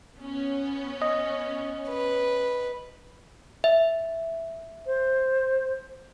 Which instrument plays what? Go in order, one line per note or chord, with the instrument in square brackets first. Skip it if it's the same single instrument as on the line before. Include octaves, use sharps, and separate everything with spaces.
[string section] B3 C#4
[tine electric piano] D#5
[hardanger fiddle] B4
[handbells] E5
[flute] C5